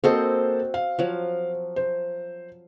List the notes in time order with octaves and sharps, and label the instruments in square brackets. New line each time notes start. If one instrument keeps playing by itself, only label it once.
[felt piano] A#3 A4 C5 [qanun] C4 F#4 D#5
[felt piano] F5
[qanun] F3 F#3
[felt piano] C5